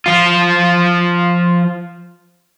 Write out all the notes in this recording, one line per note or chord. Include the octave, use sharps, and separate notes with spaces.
F3 F4